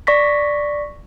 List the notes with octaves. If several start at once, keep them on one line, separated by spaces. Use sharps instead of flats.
D5 C#6 A#6 B6